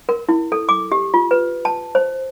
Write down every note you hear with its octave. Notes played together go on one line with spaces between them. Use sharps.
A#4
E4
A4
D6
G4
F4
B4
A5
C5